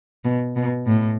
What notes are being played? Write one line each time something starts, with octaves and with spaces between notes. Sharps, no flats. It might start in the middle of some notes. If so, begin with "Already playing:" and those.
B2
B2
A2